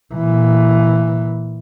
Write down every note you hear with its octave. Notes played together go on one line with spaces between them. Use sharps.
A#2 E3